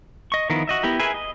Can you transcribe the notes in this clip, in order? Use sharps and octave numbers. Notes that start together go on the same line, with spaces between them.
D#5 C#6
D#3 F3 B3 E4 A#4
F#4 D#5 E5
B3 E4 G4 A#4
G#4 A#4 B4 E5 G#5
D#5